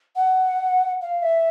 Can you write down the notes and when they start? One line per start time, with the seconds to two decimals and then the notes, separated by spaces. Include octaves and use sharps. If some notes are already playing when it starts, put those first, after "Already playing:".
0.16 F#5
1.01 F5
1.22 E5